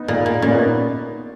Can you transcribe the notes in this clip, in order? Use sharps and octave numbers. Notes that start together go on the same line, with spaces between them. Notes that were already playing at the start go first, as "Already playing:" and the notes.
Already playing: B3 D#4
A#2
A#2
A#2 A#3 C#4
B3 D#4